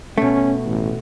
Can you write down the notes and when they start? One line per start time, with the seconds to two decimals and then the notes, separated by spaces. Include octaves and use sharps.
0.18 B2 A3 C#4
0.66 A1